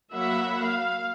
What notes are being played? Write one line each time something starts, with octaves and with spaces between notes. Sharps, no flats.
F#3 A#3 E5 F#5 B5
F5